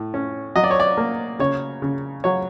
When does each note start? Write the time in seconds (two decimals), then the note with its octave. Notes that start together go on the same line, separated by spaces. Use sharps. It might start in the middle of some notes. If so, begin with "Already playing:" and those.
Already playing: A2
0.14 C#4
0.56 F#3 D#5
0.64 D5
0.71 C#5
0.80 D5
0.97 A#3
1.39 C#3 C#5
1.82 C#3
2.24 F#3 C#5